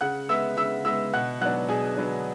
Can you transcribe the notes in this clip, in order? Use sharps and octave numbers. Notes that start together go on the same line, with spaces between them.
C#3 F#5 F#6
G#3 B3 E5 E6
C#3 E5 E6
G#3 B3 E5 E6
B2 F#5 F#6
F#3 B3 D4 F#5 F#6
B2 G#4 G#5
F#3 B3 D4